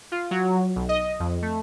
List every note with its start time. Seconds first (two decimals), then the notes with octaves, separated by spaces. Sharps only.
0.12 F4
0.31 F#3
0.76 B1
0.89 D#5
1.20 F2
1.42 A3